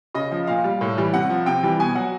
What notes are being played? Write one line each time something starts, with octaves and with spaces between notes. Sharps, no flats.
C#3 D#5
F3
A#2 F5
G3
A2
E3 G3
C3 F#5
F3
C3 G5
E3 G3
B2 G#5
F#3 F#5